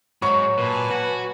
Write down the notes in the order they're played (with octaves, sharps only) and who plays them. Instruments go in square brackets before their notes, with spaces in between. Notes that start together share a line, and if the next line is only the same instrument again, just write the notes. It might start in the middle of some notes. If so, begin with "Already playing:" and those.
[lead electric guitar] G#2 [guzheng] F#3 B5 [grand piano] C#6
[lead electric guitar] A#2 [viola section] B4 G#5 A5
[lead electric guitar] F#4